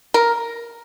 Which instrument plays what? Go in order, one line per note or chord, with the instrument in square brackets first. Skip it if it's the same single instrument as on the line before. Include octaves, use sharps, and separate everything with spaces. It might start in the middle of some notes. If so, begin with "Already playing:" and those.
[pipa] A#4